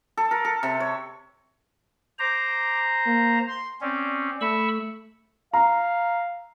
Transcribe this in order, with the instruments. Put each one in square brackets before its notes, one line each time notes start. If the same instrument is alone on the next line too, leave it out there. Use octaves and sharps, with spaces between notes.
[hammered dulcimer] A4
A#4
A4
C3
C#5
[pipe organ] C5 A#5 [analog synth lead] D6
[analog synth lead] A#3
C6
[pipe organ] C4 C#4 [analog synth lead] D5
[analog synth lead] A3 [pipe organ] B5 C#6 E6
[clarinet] F5 [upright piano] A#5